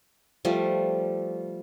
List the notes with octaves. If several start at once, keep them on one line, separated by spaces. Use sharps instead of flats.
F3 G3 A3